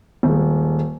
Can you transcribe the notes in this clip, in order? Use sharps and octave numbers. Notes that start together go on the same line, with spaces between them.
D#1 G#3